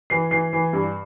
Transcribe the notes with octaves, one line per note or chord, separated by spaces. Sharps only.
E3 C7
E3 C7
E3
G2